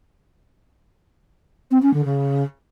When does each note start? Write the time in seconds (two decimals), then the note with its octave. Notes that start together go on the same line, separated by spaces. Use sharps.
1.71 C4
1.82 C#4
1.93 D3
2.05 C#3